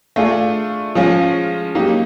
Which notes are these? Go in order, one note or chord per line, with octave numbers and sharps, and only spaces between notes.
A3 D4 F4 G#4
F3 G#3 C#4 F4 G#4
F#3 A#3 D#4 G4